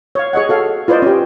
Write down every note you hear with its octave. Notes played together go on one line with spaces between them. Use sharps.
C#5 F5
G#4 C#5 D#5 F#5
F#4 A4 F5
F4 B4 C5 D5 D#5
C#4 G4